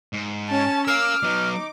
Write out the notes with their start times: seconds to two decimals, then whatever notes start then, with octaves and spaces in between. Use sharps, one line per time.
0.13 G#2
0.50 C#4 A5
0.87 A#4 F5 D6 E6 F6
1.23 F#3 B3 D#4